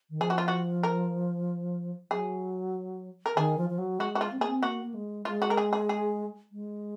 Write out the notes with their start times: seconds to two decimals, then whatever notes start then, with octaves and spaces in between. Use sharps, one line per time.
0.10 D#3
0.20 F3 G#4
0.30 F#4
0.38 F4
0.48 F#4
0.83 A#4
2.10 F#3 G#4
3.26 A#4
3.36 D#3 G#4
3.58 F3
3.70 F3
3.78 F#3
3.99 G#3 F#4
4.15 F#4
4.21 F4
4.31 C4
4.39 A#3 G#4
4.47 C4
4.63 A#3 F#4
4.83 A#3
4.94 G#3
5.25 G#3 F4
5.42 F#4
5.50 A#4
5.57 G#4
5.73 G#4
5.89 G#4
6.52 G#3